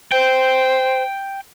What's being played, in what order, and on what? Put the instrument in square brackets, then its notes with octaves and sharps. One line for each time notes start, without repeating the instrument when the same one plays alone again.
[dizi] C5 [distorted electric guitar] G5